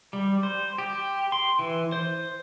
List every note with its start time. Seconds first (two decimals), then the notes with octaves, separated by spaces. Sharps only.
0.13 G3
0.43 C5
0.78 G4
1.32 C6
1.59 E3
1.92 C5